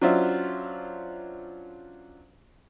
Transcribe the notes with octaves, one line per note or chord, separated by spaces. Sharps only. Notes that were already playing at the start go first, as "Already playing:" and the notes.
F#3 C#4 D4 F4 C5 E5